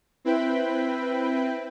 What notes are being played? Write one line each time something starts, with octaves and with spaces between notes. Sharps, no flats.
C4 E4 B4 G5 B5